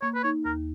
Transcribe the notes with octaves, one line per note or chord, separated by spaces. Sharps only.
A#3 C#5
B4
D#4 C#5
D#2 A#4